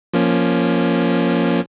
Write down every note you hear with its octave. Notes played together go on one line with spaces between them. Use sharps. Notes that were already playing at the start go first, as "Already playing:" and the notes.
F3 A#3 C#4